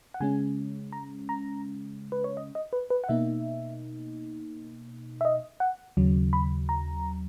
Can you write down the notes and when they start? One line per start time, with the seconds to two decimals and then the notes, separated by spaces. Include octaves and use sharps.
0.14 F#5
0.20 C#3 G#3 C#4 G#5
0.92 A#5
1.29 A#5
2.12 B4
2.24 C#5
2.37 D#5
2.55 D#5
2.73 B4
2.90 B4
3.04 F#5
3.09 B2 A#3 D#4 E5
5.21 E5
5.25 D#5
5.60 F#5
5.97 D#2 C#3 F#3
6.33 B5
6.69 A#5